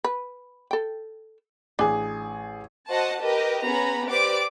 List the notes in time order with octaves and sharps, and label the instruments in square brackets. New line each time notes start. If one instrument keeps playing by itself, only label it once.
[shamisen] B4
A4 G5
[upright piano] A1 G#4 [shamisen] D4
[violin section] F#4 C5 D#5 F#5 A5
G4 A#4 B4 D#5
B3 C#4 G#4 A#5 B5
G4 B4 C5 D5 D6